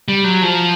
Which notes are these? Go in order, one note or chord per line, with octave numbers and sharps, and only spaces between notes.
G3
F#3
F3